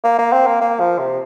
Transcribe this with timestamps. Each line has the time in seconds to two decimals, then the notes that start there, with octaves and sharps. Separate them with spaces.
0.04 A#3
0.18 A#3
0.33 C4
0.46 A#3
0.61 A#3
0.80 F3
0.99 C3